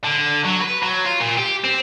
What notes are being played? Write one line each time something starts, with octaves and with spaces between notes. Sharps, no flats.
D3
F#3
B4
F#3
F4
A#2
G4
C4